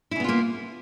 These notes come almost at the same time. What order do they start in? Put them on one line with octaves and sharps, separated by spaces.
E4 C#3 B3 F4 A#3